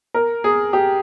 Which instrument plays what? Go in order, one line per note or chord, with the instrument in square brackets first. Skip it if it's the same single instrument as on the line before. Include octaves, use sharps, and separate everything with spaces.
[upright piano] A#4
G#4
G4